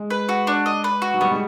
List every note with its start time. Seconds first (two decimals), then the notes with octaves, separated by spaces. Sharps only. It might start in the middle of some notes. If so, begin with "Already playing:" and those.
Already playing: G#3
0.10 B4
0.29 F#4
0.47 D4
0.66 D#5
0.84 B4
1.02 F#4
1.14 F#3
1.20 G3 B3
1.31 G#3